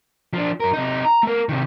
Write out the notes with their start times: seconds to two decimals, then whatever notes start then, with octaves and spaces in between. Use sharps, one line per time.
0.34 F3 D4
0.60 F#2 A#4
0.73 C3 D#4
1.05 A#5
1.23 A3 A#4
1.49 C3 D#3